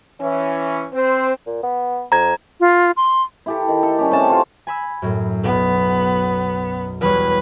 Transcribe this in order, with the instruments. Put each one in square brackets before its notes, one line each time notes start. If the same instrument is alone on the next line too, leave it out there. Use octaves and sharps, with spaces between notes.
[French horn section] E3 C#4
[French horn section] C4 [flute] C5
[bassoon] A#2
B3
[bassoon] F2 [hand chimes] A#5 G#6
[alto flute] F4
C6
[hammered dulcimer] E4 G4 A4
D#3
A4
G3 C#4 G4
C3 C#4 A5
F4 C#5 F5
[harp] G#5 B5 E6
F#2 A2
[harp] B1 [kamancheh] B3
[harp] E2 G3 C#5 [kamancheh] B4